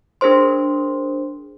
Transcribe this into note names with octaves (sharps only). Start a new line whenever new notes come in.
D4 G#4 A#4 C5 C6